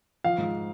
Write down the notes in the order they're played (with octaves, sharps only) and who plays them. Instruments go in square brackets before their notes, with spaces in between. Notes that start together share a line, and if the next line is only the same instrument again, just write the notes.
[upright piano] F3 F5
G#2